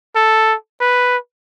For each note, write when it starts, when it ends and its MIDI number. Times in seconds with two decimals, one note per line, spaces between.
0.15 0.55 69
0.80 1.17 71